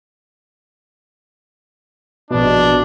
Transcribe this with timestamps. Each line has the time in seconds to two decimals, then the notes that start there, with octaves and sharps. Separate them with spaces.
2.31 A#1 B2 D4